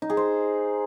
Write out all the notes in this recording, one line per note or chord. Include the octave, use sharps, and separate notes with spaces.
D#4
G#4
C5